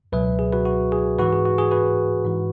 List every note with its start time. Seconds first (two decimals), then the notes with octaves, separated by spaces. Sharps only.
0.12 C#2 B2 F#3 B4 E5
0.39 G#4
0.53 F#4 B4
0.65 F#4
0.92 G#4
1.19 G#2 E3 F#4 B4
1.33 G#4
1.45 F#4
1.58 G#4
1.71 F#4 B4
2.25 G#2 E3